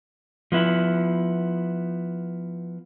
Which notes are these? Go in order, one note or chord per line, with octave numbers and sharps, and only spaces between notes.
F3 B3 E4